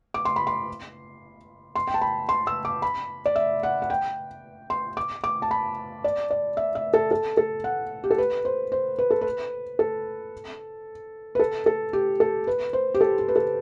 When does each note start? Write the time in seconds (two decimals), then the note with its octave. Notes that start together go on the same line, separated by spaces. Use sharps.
0.14 D6
0.25 C6
0.36 B5
0.47 C6
1.75 C6
1.88 G5
1.94 A5
2.02 B5
2.29 C6
2.47 E6
2.65 D6
2.82 B5
3.26 D5
3.36 E5
3.63 F#5
3.82 F#5
3.90 G5
4.70 C6
4.97 D6
5.24 D6
5.42 A5
5.51 B5
6.04 D5
6.31 D5
6.57 E5
6.75 E5
6.94 A4
7.11 A4
7.37 A4
7.64 F#5
8.04 G4
8.11 A4
8.18 B4
8.45 C5
8.72 C5
8.99 B4
9.11 A4
9.21 B4
9.79 A4
11.35 B4
11.39 A4
11.66 A4
11.93 G4
12.20 A4
12.47 B4
12.73 C5
12.94 G4
13.01 A4
13.19 G4
13.28 B4
13.36 A4